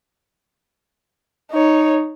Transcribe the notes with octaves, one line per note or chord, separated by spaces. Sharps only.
D#4 C#5